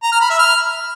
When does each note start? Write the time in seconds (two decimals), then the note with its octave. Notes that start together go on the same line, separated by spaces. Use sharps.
0.03 A#5
0.12 F6
0.21 B5
0.30 E5
0.39 F6